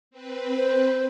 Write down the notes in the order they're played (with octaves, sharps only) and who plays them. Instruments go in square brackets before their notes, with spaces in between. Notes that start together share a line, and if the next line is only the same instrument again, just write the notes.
[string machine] C4 B4
[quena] C5